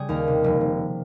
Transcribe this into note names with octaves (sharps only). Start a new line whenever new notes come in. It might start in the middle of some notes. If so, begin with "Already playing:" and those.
Already playing: C#3 G3 G#4
D#2 A#4
C3
F1
C3